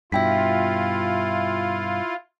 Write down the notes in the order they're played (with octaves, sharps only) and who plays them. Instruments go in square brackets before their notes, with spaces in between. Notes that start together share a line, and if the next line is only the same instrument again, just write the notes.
[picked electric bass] G2 B2 [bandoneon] E4 [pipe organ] F4 [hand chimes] E5 G5 B6